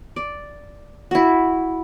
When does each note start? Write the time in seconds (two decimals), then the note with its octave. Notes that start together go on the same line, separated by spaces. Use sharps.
0.16 D5
1.11 E4 F#4